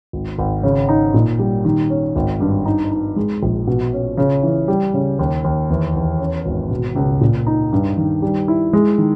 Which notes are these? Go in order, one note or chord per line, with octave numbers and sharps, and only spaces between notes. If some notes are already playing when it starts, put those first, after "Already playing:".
G#1
G#1
C#3
D#4
A#2
G3
D#3
C#4
G#1
G2
D#4
D#4
G#3
A#1
B2
C#4
C#3
E3
G3
C#3
D#2
D#2
E2
E2
C#4
G#1
B2
C#2
A#2
D#4
G2
D#3
G3
E4
G#3
D#3